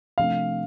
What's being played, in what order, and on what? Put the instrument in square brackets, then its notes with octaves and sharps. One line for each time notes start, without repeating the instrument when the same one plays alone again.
[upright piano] C3 F3 A3 D4 [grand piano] F5